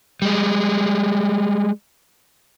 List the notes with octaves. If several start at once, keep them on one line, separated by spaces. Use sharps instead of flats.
G3 G#3